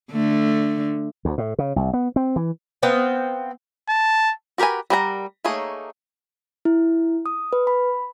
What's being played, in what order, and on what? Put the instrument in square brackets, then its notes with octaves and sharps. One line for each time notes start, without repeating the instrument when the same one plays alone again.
[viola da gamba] D3 A3
[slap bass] D2
A2
C#3
C2
B3
C4
E3
[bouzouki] B3 C4 F5 G5
[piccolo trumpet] A5
[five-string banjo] F#4 G4 A#4 B4 G#5
G3 A#4 F#5 G5 A#5
A3 A#3 D#4 G#4 C#5
[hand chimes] E4
D#6
B4
B5